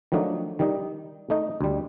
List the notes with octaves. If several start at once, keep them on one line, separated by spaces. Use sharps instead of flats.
D#3 F3 F#3 A3 D4 D#4
D#3 G3 D#4
A3 D#4 D#5
D2 G3